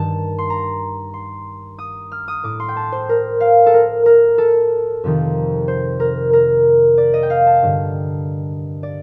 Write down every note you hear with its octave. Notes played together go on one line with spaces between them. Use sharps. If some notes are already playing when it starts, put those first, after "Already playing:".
Already playing: G2 D#3 A5
C6
A#5
C6
D#6
F6
D#6
A2 D6
C6
G5
A5
C5
A#4
F5
A4
A#4
A#4
A4
F2 C3 D#3
C5
A#4
A#4
D5
D#5
G5
F5
A5
G2 D3
D5